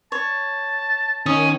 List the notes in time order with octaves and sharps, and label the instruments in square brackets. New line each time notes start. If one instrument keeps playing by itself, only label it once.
[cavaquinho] C#5 [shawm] A5
[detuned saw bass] D#3 [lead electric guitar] C#4 [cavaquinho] D#6